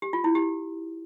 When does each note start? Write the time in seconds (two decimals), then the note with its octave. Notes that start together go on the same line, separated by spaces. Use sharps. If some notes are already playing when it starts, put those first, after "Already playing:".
0.02 G4
0.13 F4
0.24 E4
0.35 G4